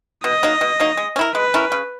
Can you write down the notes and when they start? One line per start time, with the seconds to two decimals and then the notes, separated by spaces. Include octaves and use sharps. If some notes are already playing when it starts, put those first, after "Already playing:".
0.24 B2 D#5
0.43 F#3 A#3 D#4
0.61 B2
0.80 F#3 A#3 D#4
0.97 G#3
1.16 C#4
1.19 E4 A#4
1.34 G#3 B4
1.54 C#4 E4 A#4
1.72 C#3